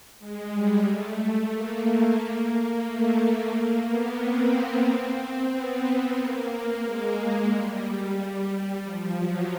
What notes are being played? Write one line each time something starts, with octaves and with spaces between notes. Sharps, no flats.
G#3
G3
A3
A#3
A3
A#3
B3
C4
C4
B3
A#3
G#3
G3
F3
F#3